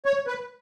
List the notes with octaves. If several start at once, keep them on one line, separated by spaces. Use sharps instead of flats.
C#5
B4